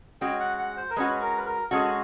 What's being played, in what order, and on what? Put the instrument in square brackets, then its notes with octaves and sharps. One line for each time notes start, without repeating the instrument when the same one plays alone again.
[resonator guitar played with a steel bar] G#3 C#4 F#4 [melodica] G5
[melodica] F#5
F#5
C5
A#4
[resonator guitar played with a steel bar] G#3 C#4 F#4 [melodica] B4
[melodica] A#4
B4
A#4
[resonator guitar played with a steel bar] G#3 C#4 F#4 [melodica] A4